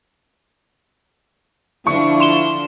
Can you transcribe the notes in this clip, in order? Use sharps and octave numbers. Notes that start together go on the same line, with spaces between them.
D3 F3 D4 E4 C#6
C6 E7 G7